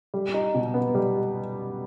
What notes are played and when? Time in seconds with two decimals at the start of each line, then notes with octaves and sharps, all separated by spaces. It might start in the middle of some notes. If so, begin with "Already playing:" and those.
0.14 G3
0.34 D#4
0.55 B2
0.74 B3
0.95 G3